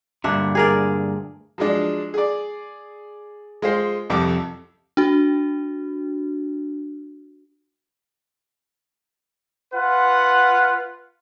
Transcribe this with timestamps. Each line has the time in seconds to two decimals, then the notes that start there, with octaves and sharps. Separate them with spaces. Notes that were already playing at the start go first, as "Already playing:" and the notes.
0.24 D2 G2 A#2 D4 E5
0.55 G#4 A#4 D5
1.58 F3 F#3 G#3 D4
2.14 G#4 D5
3.62 G#3 F4 C5
4.10 C2 F2 G3 A4 D6
4.97 D4 F#4
9.74 F4 B4 F#5